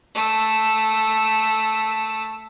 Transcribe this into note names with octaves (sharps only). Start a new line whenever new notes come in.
A3 E6